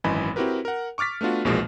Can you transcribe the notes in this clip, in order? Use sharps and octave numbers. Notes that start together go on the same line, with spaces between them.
G#1 F#2 E3 D#5 G#5 B5
C4 E4 F#4 G4 A#4 B4
A#4 F#5
C#6 D6 F6 A6 B6
A3 B3 D4 F4 F#4
A#1 E2 B2 F3 G#3 A#3